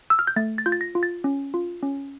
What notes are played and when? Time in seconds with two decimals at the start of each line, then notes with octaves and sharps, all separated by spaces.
0.10 E6
0.19 F6
0.27 G6
0.36 A3 A6
0.58 A6
0.66 F4 G6
0.72 A6
0.81 A#6
0.95 F4
1.03 A6
1.24 C#4
1.54 F4
1.83 C#4